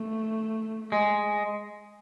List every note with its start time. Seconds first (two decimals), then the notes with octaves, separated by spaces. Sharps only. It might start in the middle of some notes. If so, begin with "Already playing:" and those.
Already playing: A3
0.92 G#3